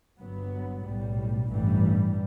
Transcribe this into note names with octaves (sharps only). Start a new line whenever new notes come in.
G1 G2 F#3 B3
B1 A2 G3
A1 G2 E3 G3